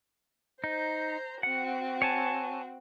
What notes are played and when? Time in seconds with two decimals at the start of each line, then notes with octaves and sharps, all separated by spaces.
0.64 D#4 C5 A#5
1.43 C4 F#4 F#5
2.02 C#5 G#5 A5